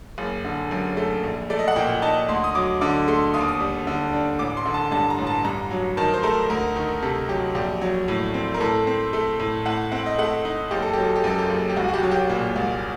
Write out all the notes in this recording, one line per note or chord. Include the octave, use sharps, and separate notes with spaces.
F#1
D3
F#2
A3
A#1
A3 D5
D#5
F#5
A#2 G5
D#4 A5
D2 C6
D#6
F#3 D6
D3 D6
A3 C6
D#2 D#6
D6
D#6
G3
D3
D4
A1 D6
C6
D3
A5
G2 A5
A#5
A1
A5
G2 A#5
F#3
D#3 A5
C5
A3 A#4
D2 A#4
D#3
C3 A4
F#3 G4
A#1 G4
F#3
A2
C4
A#4
A2 A4
C4
A3
A2
A2 F#5
C4 F#5
D#5
A3 F#5
D#4
F#1 G4
A4
F#3 G4
A4
G4
F#2 A4
G4
F#1
G4
C2 F#4
F#4
G4
F#3
G4
A#2
C2